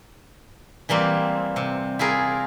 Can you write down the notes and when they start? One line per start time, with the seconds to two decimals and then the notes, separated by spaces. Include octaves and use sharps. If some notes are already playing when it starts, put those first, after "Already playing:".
0.89 E3 G3 A#3 C4
1.56 C3
1.99 E4 F4 G#4 A#4